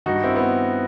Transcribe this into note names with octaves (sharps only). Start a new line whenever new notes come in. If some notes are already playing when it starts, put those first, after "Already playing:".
G2 D#3 D#4 F#4
C4 E4
B3